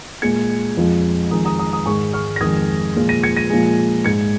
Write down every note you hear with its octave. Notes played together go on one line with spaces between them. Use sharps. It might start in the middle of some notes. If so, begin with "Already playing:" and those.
A#2 G#3 G#6 C#7
F2 F3 G#3
F2 D#3 G#3 A#5 D#6
A#5 D#6
A#5 D#6
A#5 D#6
G#2 D#3 G#3 G#5 C#6
C#6 F6
A#6
F2 D#3 G#3 D#6 G#6
A#2 F3 G#3
A#6 D#7
G#6 C#7
A#6 D#7
A#2 F3 G#3
G#2 G#3 G#6 C#7